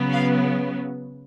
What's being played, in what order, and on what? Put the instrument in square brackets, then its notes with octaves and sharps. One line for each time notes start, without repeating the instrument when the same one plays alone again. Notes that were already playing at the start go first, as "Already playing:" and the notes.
Already playing: [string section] C#3 F#3 B3
F5